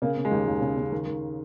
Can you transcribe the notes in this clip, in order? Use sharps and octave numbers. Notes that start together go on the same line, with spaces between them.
C#3 A#3
C#3
G#3
D#2
D#2
C#3
C#3
D#3
D#3